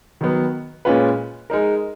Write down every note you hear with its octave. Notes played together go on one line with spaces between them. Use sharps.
D#3 F#3 B3
A#2 G#3 C#4 F4 B4
G#3 D#4 A#4